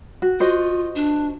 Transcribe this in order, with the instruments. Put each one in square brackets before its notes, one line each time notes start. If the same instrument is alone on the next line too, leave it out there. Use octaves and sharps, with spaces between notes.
[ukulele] F#4
[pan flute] F4 [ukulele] F#4 C5 D#5
[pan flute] D4